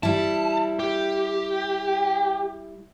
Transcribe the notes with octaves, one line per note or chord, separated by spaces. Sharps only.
G3 E4 A5
G4